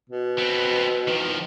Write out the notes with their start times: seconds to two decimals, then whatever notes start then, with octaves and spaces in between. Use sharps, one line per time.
0.09 B2
0.38 B3 C4
1.08 D#3 F3